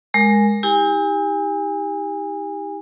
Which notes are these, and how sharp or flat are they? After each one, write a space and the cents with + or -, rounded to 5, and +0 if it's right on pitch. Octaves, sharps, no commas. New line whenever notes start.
G#3 +0 A#4 +0
E4 -40 G4 +20 G#5 -30